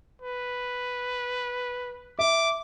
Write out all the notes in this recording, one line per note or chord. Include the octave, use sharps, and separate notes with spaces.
B4
E5 D6